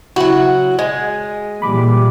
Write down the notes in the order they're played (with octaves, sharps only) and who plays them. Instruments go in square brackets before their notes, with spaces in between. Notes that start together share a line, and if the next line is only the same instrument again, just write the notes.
[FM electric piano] C#3 E4 [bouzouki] F#3 F#4
[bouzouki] G#3 [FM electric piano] G#5
[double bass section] A#2 E3 G3 [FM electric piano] B5 D6